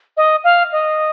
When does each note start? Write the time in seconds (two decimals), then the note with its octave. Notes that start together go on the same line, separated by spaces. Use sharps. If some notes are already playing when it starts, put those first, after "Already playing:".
0.17 D#5
0.44 F5
0.72 D#5